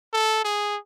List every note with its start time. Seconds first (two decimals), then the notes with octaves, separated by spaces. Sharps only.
0.13 A4
0.44 G#4